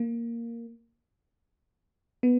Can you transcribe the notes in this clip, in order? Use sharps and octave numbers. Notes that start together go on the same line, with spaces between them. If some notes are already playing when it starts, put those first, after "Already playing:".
Already playing: A#3
B3